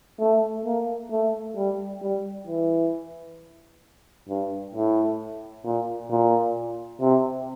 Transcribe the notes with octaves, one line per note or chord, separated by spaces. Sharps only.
A3
A#3
A3
G3
G3
E3
G2
A2
A#2
A#2
C3